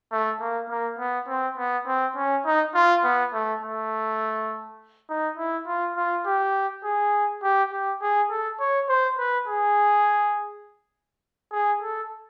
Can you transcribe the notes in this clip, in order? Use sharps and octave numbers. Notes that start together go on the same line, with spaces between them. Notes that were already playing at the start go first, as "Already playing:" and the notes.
A3
A#3
A#3
B3
C4
B3
C4
C#4
D#4
F4
B3
A3
A3
D#4
E4
F4
F4
G4
G#4
G4
G4
G#4
A4
C#5
C5
B4
G#4
G#4
A4